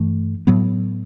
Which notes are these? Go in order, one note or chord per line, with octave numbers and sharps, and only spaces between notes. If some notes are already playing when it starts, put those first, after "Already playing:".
Already playing: G2 E3 A3
A2 F#3 B3